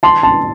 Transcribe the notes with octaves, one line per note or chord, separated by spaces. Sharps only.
A5 C6
A5 C6